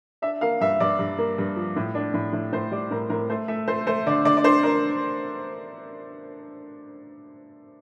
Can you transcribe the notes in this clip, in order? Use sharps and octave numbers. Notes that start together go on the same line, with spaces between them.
D4 E5
A#3 F5
G2 E5
G2 D5
G2
A#3
G2
F3
A2
D4
A2
A2
A2 C5
G3 D5
A2 A#4
A2 A#4
A3 C5
A3 E5
A3 C5
A3 C5
D3 D5
D3 D5
D5
D4 C5
D4 A#4